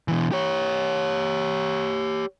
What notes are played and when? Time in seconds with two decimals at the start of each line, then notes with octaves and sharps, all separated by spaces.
0.08 B2 E3
0.32 G4 C#5